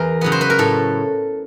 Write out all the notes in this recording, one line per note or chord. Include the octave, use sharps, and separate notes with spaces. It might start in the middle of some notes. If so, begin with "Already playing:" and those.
Already playing: E2 E3 A#4
C#3 F#3 B3
C5
B4
A#4
A2 A4